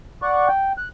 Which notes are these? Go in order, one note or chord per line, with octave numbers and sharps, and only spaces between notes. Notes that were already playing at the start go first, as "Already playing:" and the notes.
D5 F#5 C#6
G5
F#6